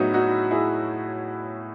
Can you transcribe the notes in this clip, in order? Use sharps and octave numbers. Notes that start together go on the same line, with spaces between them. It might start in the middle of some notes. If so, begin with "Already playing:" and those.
Already playing: A2 F#3 B3 D#4 E4 F#4 G#4 B4
D#4 F#4
E4 G#4